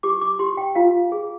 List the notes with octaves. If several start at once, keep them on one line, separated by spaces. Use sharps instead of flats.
G4 D6
D6
G4 C6
G5
F4 F5
G#4